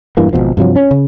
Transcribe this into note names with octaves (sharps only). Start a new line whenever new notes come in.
E1 G2 E3 A#3
G#1 C#2 B2 F3
G2 C3 F3 F#3
C#4
C#3